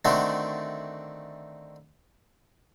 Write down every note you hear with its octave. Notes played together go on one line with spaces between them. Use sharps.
D3 D#3 A3 C4 D4 F#4